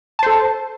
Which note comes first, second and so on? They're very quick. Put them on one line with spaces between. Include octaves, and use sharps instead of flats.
A5 C5 A4